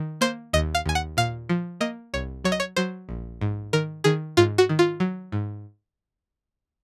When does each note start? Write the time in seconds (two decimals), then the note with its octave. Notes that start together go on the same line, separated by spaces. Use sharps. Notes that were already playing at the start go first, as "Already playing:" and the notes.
Already playing: D#3
0.21 A#3 C5
0.53 D#2 D#5
0.75 F5
0.86 D#2 G#5
0.95 F#5
1.17 A#2 F5
1.49 F3
1.81 A#3 D#5
2.14 C2 C#5
2.44 F#3 C#5
2.52 D#5
2.60 C#5
2.76 F#3 C5
3.09 A#1
3.41 G#2
3.73 D#3 A#4
4.04 D#3 G#4
4.37 G#2 F4
4.58 F#4
4.69 D#3
4.79 F4
5.00 F#3
5.32 G#2